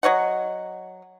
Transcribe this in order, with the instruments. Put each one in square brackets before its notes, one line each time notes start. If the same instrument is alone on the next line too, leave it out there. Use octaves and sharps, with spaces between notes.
[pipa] F#3 C#5 D#5 F#5